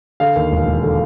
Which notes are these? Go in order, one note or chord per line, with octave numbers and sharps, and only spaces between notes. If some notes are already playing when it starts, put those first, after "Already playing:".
D3 F5
D#2
E1
E1
D3